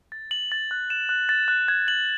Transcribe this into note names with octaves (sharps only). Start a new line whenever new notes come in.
A6
F#7
A6
F#6
E7
F#6
A6
F#6
G#6
F#7